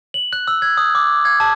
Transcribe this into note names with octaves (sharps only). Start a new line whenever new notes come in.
F#7
F#6
E6
G#6
D#6
D6
G#6
A5